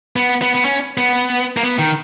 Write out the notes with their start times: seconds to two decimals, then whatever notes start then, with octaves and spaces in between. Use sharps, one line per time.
0.16 B3
0.42 B3
0.55 B3
0.65 C#4
0.97 B3
1.57 A#3
1.63 B3
1.79 D#3